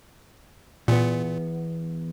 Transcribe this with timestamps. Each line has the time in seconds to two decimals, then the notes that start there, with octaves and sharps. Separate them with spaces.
0.88 E2 A#2 B3